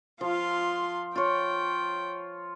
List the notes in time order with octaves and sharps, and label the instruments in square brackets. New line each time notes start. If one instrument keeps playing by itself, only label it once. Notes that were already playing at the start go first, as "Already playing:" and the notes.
[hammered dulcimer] F3 [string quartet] F4 F5 C6
[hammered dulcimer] F4 C#5 [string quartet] G5